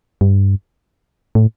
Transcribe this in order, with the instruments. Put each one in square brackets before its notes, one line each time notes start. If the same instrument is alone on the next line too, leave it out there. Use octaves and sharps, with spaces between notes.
[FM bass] G2
A2